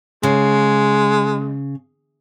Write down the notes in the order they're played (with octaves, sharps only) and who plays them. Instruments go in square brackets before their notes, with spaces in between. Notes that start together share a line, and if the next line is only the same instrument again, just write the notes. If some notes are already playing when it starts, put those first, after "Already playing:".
[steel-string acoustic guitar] C#3 [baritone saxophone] G#3